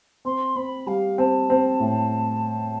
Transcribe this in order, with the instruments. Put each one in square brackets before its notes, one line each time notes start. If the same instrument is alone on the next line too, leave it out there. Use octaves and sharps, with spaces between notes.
[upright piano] C4 [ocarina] C6
[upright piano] C4 [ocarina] B5
[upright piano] G3 [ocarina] F5
[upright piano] C4 [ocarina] A5
[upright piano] C4
A2